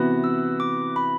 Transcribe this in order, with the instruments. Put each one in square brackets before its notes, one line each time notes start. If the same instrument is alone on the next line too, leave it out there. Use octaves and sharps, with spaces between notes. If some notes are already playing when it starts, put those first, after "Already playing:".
Already playing: [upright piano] C3 E3 B3 F#4 B4
[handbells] E6
D6
B5